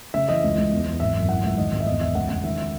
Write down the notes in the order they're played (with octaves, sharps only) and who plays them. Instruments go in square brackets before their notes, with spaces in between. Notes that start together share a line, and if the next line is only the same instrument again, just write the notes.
[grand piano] C#3 E5
E3 D#5
C#2
C#2
E2
E2
G#1 E5
F#2
E3 F#5
C#2 E5
D#3 D#5
G#1
E5
E2 D#5
E2 E5
C#2 F#5
C#2 F#5
D#3 E5
E5